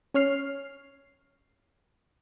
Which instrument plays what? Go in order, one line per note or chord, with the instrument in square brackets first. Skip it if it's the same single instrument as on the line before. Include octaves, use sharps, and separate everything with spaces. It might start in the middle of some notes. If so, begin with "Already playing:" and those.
[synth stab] C#4 C#5 F6 C7